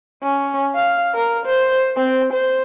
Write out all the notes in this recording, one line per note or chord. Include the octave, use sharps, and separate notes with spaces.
C#4
F5
A#4
C5
C4
C5